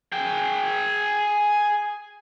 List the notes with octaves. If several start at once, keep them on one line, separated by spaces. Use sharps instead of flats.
G#4 G5